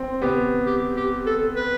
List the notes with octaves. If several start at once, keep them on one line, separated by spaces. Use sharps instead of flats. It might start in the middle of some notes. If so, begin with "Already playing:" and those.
Already playing: C4
B3 G4
G4
G4
A4
B4